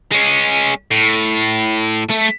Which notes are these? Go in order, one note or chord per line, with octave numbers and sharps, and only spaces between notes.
G#3 C#4
A2
A3